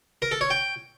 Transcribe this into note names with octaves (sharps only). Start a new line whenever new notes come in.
A#4
A4
C#5
G5